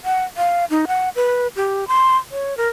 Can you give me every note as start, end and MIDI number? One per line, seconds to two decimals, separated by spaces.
0.05 0.24 78
0.37 0.65 77
0.70 0.85 63
0.88 1.09 78
1.16 1.48 71
1.56 1.85 67
1.88 2.17 84
2.31 2.56 73
2.57 2.68 70